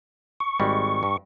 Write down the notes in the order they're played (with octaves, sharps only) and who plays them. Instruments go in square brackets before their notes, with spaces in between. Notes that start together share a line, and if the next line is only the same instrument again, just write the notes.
[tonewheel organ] C#6
[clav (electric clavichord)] G#1 G3 G#3
G2